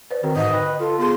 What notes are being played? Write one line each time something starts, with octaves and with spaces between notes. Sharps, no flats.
B4 C5 D5
D#3 C4 F#4 A#4
G#2 D#5
D3 B4 G5
F4 A4
B3 G#4 C6